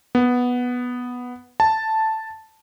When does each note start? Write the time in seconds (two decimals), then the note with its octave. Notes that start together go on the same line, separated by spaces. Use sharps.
0.15 B3
1.60 A5